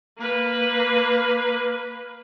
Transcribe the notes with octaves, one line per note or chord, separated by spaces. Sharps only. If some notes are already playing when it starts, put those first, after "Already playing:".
A#3 B4